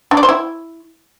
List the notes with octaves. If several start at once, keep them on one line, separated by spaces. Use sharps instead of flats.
D4
D5
C5
E4